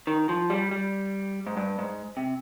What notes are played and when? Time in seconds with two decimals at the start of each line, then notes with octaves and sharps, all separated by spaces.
0.07 D#3
0.29 F3
0.50 G3
0.71 G3
1.47 G#2
1.57 G2
1.79 G#2
2.17 C3